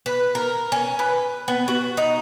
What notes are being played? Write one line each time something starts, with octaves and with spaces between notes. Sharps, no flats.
B4
A#4
C#4
B4
B3
F#4
D#4